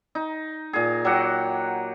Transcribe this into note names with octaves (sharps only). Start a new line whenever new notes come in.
D#4
A#2 G#4
F#3 G4 F#5